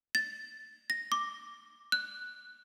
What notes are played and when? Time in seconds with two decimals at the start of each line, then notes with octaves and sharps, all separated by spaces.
0.15 A6
0.90 A#6
1.12 D6
1.92 F#6